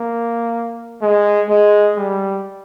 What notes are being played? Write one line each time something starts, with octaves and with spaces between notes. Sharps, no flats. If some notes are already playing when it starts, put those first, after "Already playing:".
Already playing: A#3
G#3
G#3
G3